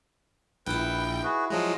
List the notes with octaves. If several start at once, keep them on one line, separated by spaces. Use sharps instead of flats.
A#1 D#4 E4 B4 G5
F#4 G#4 B4
F3 F#3 G#3 D#5 F#5